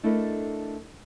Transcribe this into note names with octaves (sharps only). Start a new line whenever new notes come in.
A3 D4 E4 A4 A#4 D#5